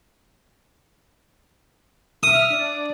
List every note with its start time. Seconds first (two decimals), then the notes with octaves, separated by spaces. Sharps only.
2.23 E5 D#6 F6
2.50 D4 D5